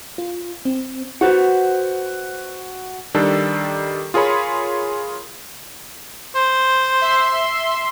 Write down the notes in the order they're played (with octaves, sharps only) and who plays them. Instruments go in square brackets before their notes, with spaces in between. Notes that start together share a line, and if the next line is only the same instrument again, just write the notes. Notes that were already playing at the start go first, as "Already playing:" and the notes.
[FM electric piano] F4
C4
[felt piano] F#4 [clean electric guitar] B4 C5 F#5
[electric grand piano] D#3 G3 D4 A4
F4 G#4 A#4 C#5 B5
[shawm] C5
[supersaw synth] E5 C6